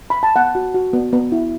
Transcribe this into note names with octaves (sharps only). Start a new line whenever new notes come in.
B5
A5
B3 F#5
F#4
F#4
B3
B3
E4